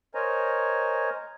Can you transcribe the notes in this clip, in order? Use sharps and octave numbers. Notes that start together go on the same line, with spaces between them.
A#4 C5 C#5 D#5 G#5 A#5